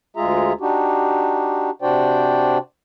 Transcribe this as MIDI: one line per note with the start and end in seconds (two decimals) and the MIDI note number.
0.17 0.53 38
0.17 0.53 56
0.17 0.53 65
0.17 0.53 68
0.17 0.53 76
0.17 0.53 82
0.61 1.70 62
0.61 1.70 63
0.61 1.70 66
0.61 1.70 67
1.82 2.58 48
1.82 2.58 62
1.82 2.58 66
1.82 2.58 72
1.82 2.58 74
1.82 2.58 79